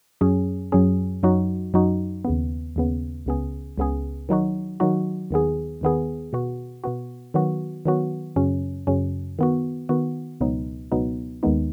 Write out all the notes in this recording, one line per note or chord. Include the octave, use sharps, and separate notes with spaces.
F#2 F#3 C#4 G#4
F#2 F#3 C#4 G#4
F#2 F#3 D#4 F#4
F#2 F#3 D#4 F#4
D#2 C#3 B3
D#2 C#3 B3
C#2 C#3 B3 G#4
C#2 C#3 B3 G#4
D#3 F#3 D#4 F#4
D#3 F#3 D#4 F#4
D#2 D#3 B3 G#4
D#2 D#3 B3 G#4
B2 B3 F#4
B2 B3 F#4
D#3 F#3 B3 F#4
D#3 F#3 B3 F#4
F#2 C#3 F#3 C#4
F#2 C#3 F#3 C#4
D#3 B3 F#4
D#3 B3 F#4
C#2 B2 F#3 B3 D#4
C#2 B2 F#3 B3 D#4
D#2 D#3 G#3 B3 D#4